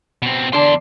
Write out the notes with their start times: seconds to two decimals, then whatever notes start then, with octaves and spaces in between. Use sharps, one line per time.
0.22 B2 C4
0.53 E2 D3 D4 A5 C6